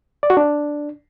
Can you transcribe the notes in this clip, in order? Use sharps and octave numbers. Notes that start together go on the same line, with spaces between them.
D5
F#4
D4